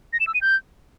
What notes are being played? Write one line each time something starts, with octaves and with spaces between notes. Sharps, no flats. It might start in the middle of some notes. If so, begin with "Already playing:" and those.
A#6
E7
E6
D#7
G6